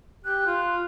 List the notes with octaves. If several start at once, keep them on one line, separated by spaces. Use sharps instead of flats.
G4 F#6
F4